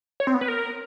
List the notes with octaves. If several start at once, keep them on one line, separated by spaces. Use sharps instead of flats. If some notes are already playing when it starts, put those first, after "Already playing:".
C#5
C4
B3
B4
A#4